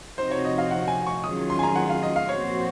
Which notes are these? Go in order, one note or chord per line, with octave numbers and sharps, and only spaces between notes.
C3 F3 C4 D#4 F#4 C5
C#5
D#5
F5
F#5
G#5
C#6
D#3 F#3 C#4 F4 G#4 D#6
C6
G#5
A#5
F#5
F5
D#5
F5
A#2 F3 C4 F#4 C5 C#5